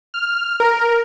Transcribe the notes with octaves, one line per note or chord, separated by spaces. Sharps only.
F6
A#4